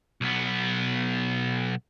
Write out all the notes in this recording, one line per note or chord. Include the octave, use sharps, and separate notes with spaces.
B1 B3